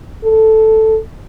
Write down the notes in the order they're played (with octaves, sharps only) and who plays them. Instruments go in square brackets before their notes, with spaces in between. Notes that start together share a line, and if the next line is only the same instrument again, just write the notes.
[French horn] A4